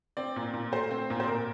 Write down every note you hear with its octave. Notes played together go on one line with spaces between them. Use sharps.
C4 D5
A#2
A#2
A3 C5
C4
A#2
C5
A#2 A#4